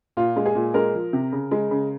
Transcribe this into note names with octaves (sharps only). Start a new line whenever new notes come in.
A#2 F4
G#3
G#4
A#2
G#3 A#4
F3
C3
C#3
G#3
C#3